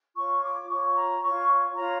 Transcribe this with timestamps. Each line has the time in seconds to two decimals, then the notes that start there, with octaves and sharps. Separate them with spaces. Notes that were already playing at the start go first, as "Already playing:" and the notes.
0.15 F4 C#5 C#6
0.43 D6
0.69 F4 C#5 C#6
0.96 A#5
1.23 F4 C#5 C#6
1.76 F4 C#5 A#5